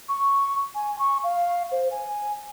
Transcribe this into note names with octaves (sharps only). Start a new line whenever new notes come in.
C#6
G#5
C#6
F5
C5
G#5